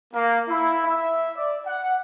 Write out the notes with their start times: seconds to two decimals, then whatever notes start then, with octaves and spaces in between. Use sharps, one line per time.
0.14 A#3
0.50 E4
0.87 E5
1.37 D5
1.66 F#5